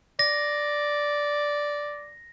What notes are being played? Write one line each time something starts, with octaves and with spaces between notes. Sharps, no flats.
D5 A#6